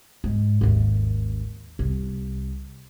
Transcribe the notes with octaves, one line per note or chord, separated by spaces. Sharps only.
G#2
G#1 D#2
C2